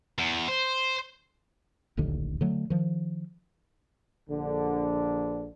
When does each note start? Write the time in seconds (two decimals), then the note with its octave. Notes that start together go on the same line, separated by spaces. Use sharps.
0.18 E2
0.48 C5
1.97 D1 A#1 D#2 D3
2.41 D3 F#3 A3
2.70 D#3 F3
4.28 A#1 D3